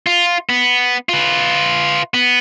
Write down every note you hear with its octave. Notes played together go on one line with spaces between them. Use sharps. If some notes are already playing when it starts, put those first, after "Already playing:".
F4
B3
F4 B4
B3